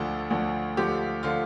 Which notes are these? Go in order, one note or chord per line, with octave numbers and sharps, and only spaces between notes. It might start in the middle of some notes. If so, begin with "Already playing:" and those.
Already playing: D2 D3 F3 A4
D2 D3 F3
D2 D3 F3 G4
D3 F3 F4